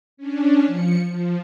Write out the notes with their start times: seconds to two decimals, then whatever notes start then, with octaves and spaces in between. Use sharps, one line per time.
0.17 C#4 D4
0.67 F3 C#7
1.11 F3